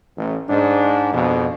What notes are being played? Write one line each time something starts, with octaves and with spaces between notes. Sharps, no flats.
A1
G#2 D4
F2 B2